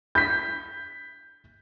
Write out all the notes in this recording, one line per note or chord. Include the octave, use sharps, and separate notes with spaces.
G6 B6